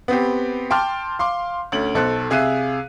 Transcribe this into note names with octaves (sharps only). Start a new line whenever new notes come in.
B3 C4 G4
G5 A5 C6 D6 F6
F5 C6 D6
D2 C#4 F#7
B1 A4 C5 F#6
C3 G#4 E5 F5 F#6 D#7